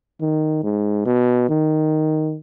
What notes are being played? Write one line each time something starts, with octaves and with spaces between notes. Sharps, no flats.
D#3
G#2
B2
D#3